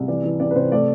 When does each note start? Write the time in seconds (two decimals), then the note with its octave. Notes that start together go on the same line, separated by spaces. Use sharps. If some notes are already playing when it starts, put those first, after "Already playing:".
Already playing: C2
0.08 E3 D5
0.24 E3
0.40 C3 D5
0.51 B4
0.55 C3 C5
0.72 A3 D5